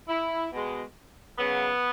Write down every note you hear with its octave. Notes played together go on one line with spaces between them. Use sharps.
E4
B2 G#3
C#3 F#3 B3